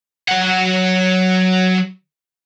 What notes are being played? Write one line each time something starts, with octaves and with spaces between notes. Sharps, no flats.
F#3 F#5